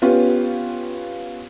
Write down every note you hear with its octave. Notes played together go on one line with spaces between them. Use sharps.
B3 C#4 F4 G4